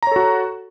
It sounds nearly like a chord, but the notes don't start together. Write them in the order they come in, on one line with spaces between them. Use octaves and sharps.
A#5 C#5 A4 F#4